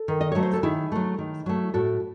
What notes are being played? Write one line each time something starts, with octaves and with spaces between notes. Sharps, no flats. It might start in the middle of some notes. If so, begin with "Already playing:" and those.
Already playing: A4
D#3
D#5
F#3 A3 C#5
C5
A4
D#3 E4 G#4
F#3 A3
D#3
F#3 A3
A2 F#4 A4